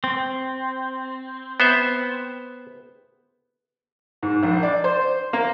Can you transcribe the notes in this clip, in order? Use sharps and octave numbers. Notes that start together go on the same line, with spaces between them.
C4
B3 C5 E5
G#2
A#1
D5
C5
A#3